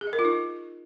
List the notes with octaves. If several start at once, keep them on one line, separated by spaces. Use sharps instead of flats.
G#4
D#5
A#4
F4
D#4